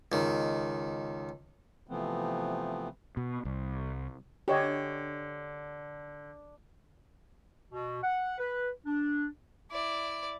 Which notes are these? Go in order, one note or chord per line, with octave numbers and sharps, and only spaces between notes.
C#2 D#3
C3 E3 F3 A3 B3 C4
B2
C2
D3 G4 C#5 D#5
B2
F#5
B4
D4
E4 D5